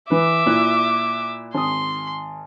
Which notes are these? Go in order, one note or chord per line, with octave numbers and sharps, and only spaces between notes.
E3 B4 E5 D6
A#2 E4 F#6
G#1 C6 D#6